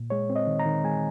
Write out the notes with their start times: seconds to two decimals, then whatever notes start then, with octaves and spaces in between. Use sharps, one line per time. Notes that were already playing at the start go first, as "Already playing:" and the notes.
Already playing: A#2
0.10 G#3 C#5
0.30 C4
0.36 D#5
0.47 D#3
0.60 A#5
0.66 D#3
0.84 G#3 G#5